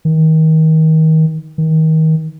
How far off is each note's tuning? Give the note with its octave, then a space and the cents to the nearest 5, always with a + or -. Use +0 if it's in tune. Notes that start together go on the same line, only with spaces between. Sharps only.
D#3 +30
D#3 +30